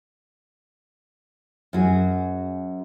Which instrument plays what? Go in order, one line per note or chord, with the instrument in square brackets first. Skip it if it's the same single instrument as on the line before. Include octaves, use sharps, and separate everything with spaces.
[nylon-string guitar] F#2 F#4 G#4